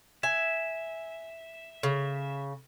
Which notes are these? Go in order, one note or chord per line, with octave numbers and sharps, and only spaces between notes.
E5 G#5
C#3